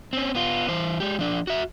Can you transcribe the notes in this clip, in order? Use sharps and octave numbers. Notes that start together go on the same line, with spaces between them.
C4 C#4
B3 F4
E3 C5
G#3 G4
F3 D4
F#4 E5